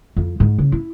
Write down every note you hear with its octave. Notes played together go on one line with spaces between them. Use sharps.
F2
G#2
C#3
E4